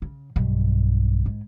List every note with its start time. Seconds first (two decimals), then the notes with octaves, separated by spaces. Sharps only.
0.02 C#3
0.36 B1 G2
1.26 G#2